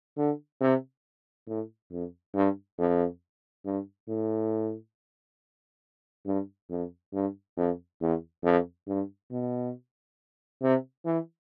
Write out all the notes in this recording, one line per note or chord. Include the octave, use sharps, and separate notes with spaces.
D3
C3
A2
F2
G2
F2
G2
A2
G2
F2
G2
F2
E2
F2
G2
B2
C3
E3